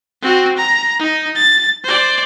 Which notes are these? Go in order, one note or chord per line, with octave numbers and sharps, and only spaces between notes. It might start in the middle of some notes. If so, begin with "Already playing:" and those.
C4 F#4
A#5
D#4
A6
C5 D5